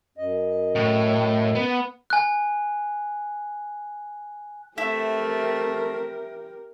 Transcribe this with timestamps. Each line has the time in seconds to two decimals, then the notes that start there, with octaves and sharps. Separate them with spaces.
0.18 F#2 D#5
0.75 A2
1.55 B3
2.10 G#5 F#6
4.78 A3 C4 E4 G4 A#4 E5